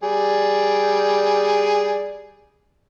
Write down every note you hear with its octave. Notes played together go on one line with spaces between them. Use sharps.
G3 G#4 D5